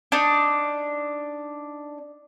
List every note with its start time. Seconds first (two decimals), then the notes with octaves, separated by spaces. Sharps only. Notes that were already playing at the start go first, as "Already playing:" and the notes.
0.12 D4 D#4